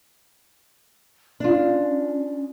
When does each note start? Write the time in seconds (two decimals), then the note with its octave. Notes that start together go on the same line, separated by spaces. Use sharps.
1.40 C#4 D4 F4